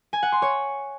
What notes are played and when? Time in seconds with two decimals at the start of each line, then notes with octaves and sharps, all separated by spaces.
0.13 G#5
0.23 F#5
0.32 C6
0.42 C#5